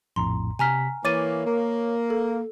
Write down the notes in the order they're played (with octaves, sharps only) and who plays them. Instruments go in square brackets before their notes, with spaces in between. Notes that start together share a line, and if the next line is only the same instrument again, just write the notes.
[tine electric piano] A#1 F2 A2 [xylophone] A#5 C6
[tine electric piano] C3 B6 [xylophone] G#5 A#5 F6
[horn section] E3 A#3 [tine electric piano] C#5 [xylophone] D6 A6 D#7
[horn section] A#3
[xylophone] A4